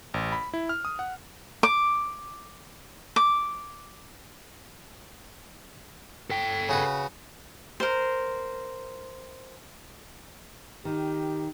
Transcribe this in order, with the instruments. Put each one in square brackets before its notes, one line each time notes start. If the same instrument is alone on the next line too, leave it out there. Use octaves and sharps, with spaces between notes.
[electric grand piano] A1
B5
E4
F6
D#6
F#5
[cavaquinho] D6
D6
[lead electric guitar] A4 G5
[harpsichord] C#3 F#4 B4
[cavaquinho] A#4 C5
[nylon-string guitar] D#3 [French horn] G4